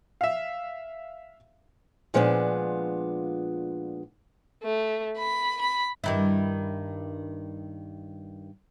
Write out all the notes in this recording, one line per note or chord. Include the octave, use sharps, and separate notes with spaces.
E5 F5
A#2 F3 G#3 B3 C#4 D4
A3
B5
B5
G2 D#3 E4